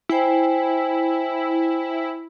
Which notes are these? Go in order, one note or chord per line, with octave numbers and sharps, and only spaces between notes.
E4 C5 G5 G#5